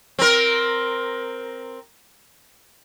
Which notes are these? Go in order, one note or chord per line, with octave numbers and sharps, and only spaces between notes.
C4 A#4